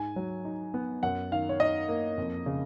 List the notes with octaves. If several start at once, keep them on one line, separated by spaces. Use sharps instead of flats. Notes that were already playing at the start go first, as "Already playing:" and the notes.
Already playing: G#2 G#5
F#3
D#4
B3
F#2 F#5
D#3 F5
C#5
D#4 D#5
A#3
F2
C#3